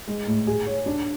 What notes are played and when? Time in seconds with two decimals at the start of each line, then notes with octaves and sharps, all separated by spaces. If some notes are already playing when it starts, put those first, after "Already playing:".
0.07 G#3
0.27 A2
0.47 G#4
0.66 C#5
0.86 D4